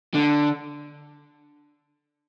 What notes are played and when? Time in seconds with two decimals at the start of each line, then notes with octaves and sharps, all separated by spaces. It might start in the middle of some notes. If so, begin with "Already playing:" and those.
0.15 D3